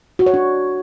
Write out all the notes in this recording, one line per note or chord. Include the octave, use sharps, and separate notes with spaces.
F#4
C#5
D4